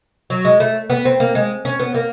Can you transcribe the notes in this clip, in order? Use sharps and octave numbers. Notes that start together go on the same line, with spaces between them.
F#3
G#3
A3
B3
C4
A#3
G#3
C#4
B3
A#3